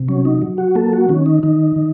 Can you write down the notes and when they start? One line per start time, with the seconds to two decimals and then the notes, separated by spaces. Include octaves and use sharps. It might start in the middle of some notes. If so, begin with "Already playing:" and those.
Already playing: C3
0.08 F#3 C#4
0.25 D#4
0.42 F#3
0.58 F#4
0.75 A#3 A4
0.93 F#4
1.09 D#3 C#4
1.26 D#4
1.43 D#3 D#4
1.76 D#3